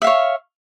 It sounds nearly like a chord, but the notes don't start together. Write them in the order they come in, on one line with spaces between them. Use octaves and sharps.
E5 F5 C#5